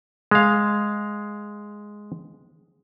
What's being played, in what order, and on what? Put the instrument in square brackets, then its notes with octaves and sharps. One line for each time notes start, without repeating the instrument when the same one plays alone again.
[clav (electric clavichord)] G#3 F5